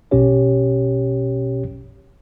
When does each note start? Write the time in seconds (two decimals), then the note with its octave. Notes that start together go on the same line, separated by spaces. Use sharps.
0.11 A#1 B2 C#4 G4 C#5